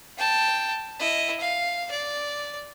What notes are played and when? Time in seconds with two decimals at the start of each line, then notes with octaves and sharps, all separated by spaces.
0.18 G5 A5
0.99 E4 D#5
1.40 F5
1.91 D5